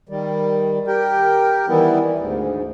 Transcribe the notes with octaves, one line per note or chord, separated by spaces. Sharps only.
D#3 G3
G4 A#4 G5
D#3 E3 G3 B3 E4
D2 G#2